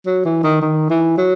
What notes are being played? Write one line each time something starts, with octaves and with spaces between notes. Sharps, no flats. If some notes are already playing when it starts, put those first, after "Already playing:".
F#3
E3
D#3
D#3
E3
F#3